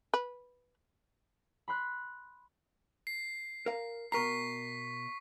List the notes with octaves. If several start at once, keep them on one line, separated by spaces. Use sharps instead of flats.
B4
B5 C6 F#6
C7
A#4 F5
B2 A#4 A#5 C#6 B6 C7